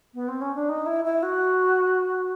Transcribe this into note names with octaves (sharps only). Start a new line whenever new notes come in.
B3
C4
C#4
D4
D#4
E4
E4
F#4